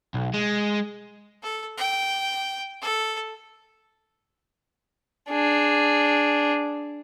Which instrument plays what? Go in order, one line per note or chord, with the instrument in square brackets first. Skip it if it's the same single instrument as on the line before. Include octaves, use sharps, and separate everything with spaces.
[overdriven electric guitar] B1
G#3
[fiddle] A4
G5
A4
D4 G#4